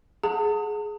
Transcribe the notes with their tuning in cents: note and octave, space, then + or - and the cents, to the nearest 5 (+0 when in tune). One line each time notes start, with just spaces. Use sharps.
G#4 +15 F#5 -25 A5 +45